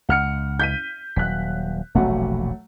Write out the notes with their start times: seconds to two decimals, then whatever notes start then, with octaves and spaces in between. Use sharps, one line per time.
0.09 C#2 F#5 F6 C#7
0.59 G6 B6 D#7
1.16 D#1 F#3 F#6 B6
1.95 E1 A#1 C3 F#3 A3 F#5